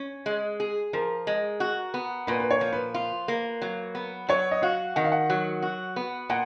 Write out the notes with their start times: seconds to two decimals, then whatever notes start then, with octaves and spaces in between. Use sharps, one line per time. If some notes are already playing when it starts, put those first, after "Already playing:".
Already playing: C#4
0.26 G#3
0.60 G#4
0.93 F3 A#4
1.27 G#3
1.60 F#4
1.94 B3
2.27 A#2 B4
2.40 B4
2.51 C#5
2.61 F3
2.73 B4
2.94 F4
3.28 A#3
3.62 F#3
3.95 B3
4.29 F#3 C#5
4.51 D#5
4.62 F#4 F5
4.96 D#3 F#5
5.04 F5
5.12 F#5
5.30 F#3
5.62 F#4
5.96 B3
6.30 A#2 F#5